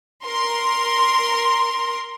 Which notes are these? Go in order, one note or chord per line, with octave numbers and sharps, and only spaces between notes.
A#4 C6